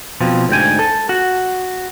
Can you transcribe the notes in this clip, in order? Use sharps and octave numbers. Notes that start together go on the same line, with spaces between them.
B2 F3 C4
D2 G#2 G5 G#5
A4
F#4